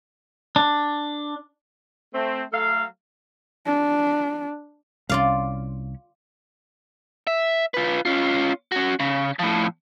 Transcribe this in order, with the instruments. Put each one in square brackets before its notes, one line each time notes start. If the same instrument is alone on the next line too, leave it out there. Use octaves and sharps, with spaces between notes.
[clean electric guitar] D4
[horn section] A3 C4
F#3 A3 A4 F5
[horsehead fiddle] D4
[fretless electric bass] C2 F3 C#4 [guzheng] F4 D5 F5
[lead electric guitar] E5
F4 B4
C#4 F4
C#4 F#4
C#3
A2 F3